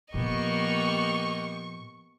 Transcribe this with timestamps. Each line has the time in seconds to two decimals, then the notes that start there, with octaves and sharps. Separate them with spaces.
0.14 A#2 F3 A#3 B3 G4 D#5 C#6